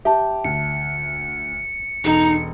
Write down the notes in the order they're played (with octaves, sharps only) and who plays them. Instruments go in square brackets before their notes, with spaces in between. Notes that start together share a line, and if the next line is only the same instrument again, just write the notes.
[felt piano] G4 [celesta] E5 A5
[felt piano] D2 [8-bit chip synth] C#7
[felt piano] E1 A4 D#5 [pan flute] D#4